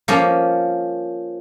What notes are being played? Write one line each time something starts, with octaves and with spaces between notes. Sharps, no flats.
F3 A#3 C#4